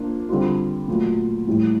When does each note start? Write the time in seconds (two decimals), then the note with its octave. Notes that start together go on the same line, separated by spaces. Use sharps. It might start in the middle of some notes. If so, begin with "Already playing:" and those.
Already playing: F3 A#3 D4 F4
0.29 D3 G3 C4 F4
0.88 A#2 F#3 A3
1.47 A2 E3 G3